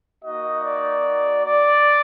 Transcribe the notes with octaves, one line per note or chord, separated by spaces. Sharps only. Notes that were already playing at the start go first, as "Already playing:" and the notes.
A#3 D#4 F#4 D#5
D5
D5